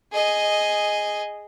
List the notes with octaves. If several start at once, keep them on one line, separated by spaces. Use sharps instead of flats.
G#4 D#5